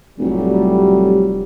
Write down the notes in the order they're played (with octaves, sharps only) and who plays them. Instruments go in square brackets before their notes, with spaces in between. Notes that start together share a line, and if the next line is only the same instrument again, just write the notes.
[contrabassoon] F1 [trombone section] A2 F#3 G3